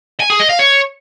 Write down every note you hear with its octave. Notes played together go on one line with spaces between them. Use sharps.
G#5
G#4
D#5
F5
C#5